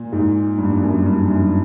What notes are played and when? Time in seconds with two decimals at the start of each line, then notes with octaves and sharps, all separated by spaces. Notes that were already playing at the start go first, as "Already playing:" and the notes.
Already playing: A#2
0.12 G#2
0.58 G2
0.70 G2
0.83 F#2
1.06 G2
1.29 F#2